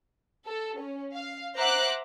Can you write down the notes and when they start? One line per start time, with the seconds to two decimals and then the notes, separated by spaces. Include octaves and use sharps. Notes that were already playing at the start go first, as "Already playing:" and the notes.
0.47 A4
0.79 C#4
1.15 F5
1.57 C5 E5 F#5 A#5 D6 F#6